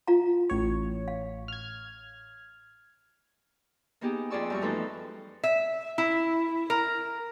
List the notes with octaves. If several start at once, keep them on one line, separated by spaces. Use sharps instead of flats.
F4 F5 A#5
A1 C#5
F5
F6 G#6
A#3 B3 D#4 G4 G#4
F2 F4 G#4 D5 C#6 E6
F#2 G3 C#6
E3 F3 A3 D#4 A4 B4
E5
E4
A#4